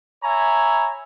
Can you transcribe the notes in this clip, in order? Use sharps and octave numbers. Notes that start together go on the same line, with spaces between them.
C#5 E5 G#5 A#5 B5